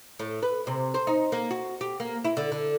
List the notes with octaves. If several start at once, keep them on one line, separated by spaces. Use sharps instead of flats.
A2
B4
C3
C5
D#4
A#3
F#4
G4
A#3
E4
D3
D3